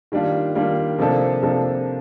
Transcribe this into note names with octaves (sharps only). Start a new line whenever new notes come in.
D#3 G3 A#3 D4 F4
D#3 G3 A#3 D4 F4
C3 F3 A#3 D4 A4
C3 F3 A#3 D4 A4